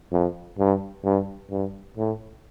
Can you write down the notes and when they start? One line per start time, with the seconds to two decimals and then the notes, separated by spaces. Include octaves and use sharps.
0.12 F2
0.59 G2
1.04 G2
1.50 G2
1.97 A2